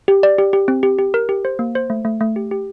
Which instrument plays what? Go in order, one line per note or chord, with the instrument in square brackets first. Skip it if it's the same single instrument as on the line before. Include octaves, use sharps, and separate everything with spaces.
[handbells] G4
D5
G4
G4
C4
G4
G4
A#4
G4
C5
A#3
C5
A3
A3
A3
G4
G4